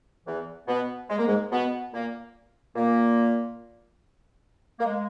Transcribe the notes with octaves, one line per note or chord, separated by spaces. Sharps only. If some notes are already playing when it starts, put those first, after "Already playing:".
E2 E3
B2 B3
G#3
A#3
G#2 G#3
B2 B3
A#2 A#3
A#2 A#3
A#3
G#3